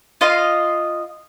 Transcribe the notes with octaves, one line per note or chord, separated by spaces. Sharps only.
F4 D#5 F5